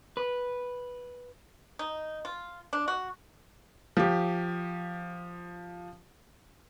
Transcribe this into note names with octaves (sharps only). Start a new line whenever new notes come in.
B4
D#4
F4
D4
F#4
F3 G4